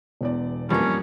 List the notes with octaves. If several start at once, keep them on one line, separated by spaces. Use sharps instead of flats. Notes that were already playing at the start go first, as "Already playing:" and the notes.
E1 E2 D5
A1 F2 G3 A#3 C#4